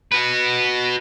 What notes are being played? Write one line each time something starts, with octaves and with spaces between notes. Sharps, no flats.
F#4 B4